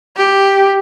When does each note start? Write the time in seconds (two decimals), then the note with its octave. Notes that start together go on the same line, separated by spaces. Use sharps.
0.17 G4